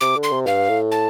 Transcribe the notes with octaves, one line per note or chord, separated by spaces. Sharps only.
C3 D6
D3
C6
C3
G2 F5
A2
A5